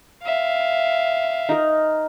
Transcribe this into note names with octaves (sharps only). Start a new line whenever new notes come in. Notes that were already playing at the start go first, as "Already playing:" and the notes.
E5 F5
D#4 A#4